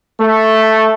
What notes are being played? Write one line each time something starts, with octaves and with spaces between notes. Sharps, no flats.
A3